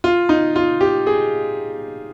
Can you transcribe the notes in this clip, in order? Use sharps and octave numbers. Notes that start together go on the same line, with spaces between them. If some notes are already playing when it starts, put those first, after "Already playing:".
F4
D#4
F4
G4
G#4